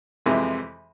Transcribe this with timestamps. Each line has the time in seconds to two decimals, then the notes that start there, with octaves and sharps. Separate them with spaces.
0.26 F2 C3 E3 G#3